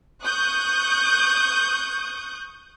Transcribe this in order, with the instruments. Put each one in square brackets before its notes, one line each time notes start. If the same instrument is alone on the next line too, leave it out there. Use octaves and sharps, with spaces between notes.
[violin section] C#6 D#6 F#6 G6